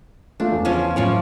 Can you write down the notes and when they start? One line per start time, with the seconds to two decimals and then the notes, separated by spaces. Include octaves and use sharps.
0.40 G#3 A3 D4 F4
0.52 E2
0.65 C#3 F3 C#4
0.96 F#2 A2 F3 C#5 D5 G#5